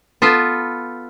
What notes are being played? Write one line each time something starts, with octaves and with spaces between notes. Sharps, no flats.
B3 F4 A4 B4